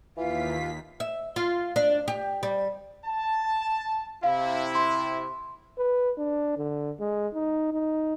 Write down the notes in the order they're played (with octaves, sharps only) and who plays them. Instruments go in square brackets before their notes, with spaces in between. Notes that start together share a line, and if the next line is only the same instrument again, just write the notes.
[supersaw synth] D#2 B6 [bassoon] E3 [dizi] F4 [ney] F5
[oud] E5
F4
D4
G4
G3
[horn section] A5
[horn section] C3 E4 [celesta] F5
[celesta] C6
[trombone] B4
D4
D3
G#3
D#4
D#4